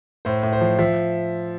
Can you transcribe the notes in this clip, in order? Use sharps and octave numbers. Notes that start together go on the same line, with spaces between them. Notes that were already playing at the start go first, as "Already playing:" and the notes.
A2 C5
A2
C5
F3
F3 E5